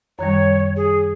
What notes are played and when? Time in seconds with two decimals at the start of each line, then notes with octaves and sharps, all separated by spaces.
0.19 F#2 D#3 G3 C#5
0.76 G#4